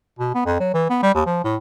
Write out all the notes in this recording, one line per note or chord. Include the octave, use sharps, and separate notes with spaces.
B2
B3
F2
F#3
E3
B3
G3
D#2
F3
A2